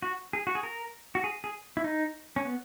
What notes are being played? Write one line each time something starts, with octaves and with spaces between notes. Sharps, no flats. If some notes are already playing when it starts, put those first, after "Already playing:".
F#4
G#4
F#4
G#4
A#4
F#4
G#4
G#4
E4
D#4
C#4
B3